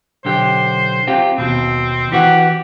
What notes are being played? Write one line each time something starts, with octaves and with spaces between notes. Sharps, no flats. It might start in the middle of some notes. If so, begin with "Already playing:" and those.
B1 D3 G4 C5
C4 F4 G4
D#2 B2 C4
E3 C4 F#4 G4